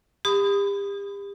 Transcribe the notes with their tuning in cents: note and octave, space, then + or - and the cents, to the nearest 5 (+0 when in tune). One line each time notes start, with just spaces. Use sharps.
G4 +35 B5 +25 D#6 +0